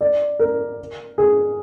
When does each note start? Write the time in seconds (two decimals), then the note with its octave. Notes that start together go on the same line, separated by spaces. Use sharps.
0.01 D5
0.39 A#4
1.18 G#4